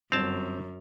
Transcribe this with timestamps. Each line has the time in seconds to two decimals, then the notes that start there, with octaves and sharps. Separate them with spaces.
0.12 G1 F#2 C4 A5 F7